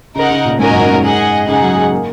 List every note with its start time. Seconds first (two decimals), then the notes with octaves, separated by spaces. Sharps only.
0.15 C#3 D#4 A#4 F#5
0.30 C#3
0.45 A#2
0.59 G#2 C#4 F#4 A#4 D#5 G#5
0.71 F#2
0.82 F#2
0.93 G#2
1.04 G#4 D#5 F#5
1.47 C#3 D#4 G#4 F#5
1.62 F#3
1.77 G#3
1.91 A#3